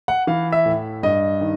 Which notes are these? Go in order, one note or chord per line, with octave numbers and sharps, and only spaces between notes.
F#5
E3 F5
E5
A2
G2 D#5
D#3